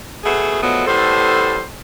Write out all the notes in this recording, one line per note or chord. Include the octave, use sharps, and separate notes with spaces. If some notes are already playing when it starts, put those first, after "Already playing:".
B2 A3 F#4 G#4
F3 F#3 G#3 A3 B3
A2 G3 B3 A4 C5